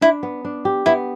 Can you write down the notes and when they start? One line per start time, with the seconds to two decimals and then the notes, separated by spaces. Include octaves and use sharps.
0.01 D4 E4
0.23 B3
0.45 D4
0.65 G4
0.86 B3 E4